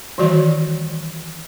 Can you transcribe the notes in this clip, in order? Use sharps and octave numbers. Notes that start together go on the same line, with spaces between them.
D#3 E3 G3 F#4 D5